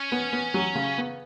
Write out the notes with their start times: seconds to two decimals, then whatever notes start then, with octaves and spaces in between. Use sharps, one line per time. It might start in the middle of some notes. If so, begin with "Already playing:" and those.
Already playing: C#4
0.12 B3
0.33 B3
0.54 F#3
0.75 C#3
0.98 B3